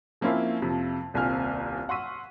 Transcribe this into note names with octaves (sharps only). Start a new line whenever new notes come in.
F3 A#3 C4 C#4 E4 F4
F2 C3 F3
D#1 C2 A#2 C4 G#5 F6
F#5 C6 C#6 E6 B6 D#7